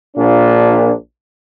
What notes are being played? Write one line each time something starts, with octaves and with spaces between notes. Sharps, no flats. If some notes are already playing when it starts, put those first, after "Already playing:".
A#1 A#2 D4